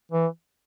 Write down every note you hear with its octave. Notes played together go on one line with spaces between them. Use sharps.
E3